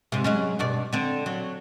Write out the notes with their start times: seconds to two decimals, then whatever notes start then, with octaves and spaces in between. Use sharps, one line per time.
0.12 G#2 C3
0.24 F#3 G#3 C#4
0.59 G2 B2 D5
0.93 D3 C4
1.26 F#3